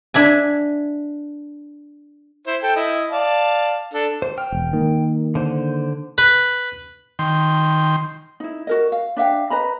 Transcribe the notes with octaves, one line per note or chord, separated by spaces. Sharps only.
D4 E5 G#5
E4 C5
A4 G5
E4 D#5
D5 F5 A5
D4 A4
C5
G5 F6
E1
D#3 A#3
D3 C5
B4
D#3 G5 C6
D#4 E4
F#4 A#4 D#5
F5
D4 E5 F5 G5
B4 D#5 A#5 B5